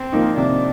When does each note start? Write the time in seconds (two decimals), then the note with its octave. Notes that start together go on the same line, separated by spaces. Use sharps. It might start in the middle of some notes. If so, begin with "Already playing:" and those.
Already playing: C4
0.12 F3 A#3 D#4
0.37 C3 D4